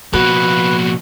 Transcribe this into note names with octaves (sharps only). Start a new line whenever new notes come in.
B2 F3 A#3 F#4 B4